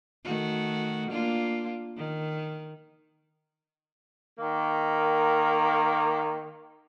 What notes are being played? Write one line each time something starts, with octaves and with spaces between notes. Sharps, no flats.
D#3 A3 F#4
A#3 D4 F4
D#3
D#3 A#3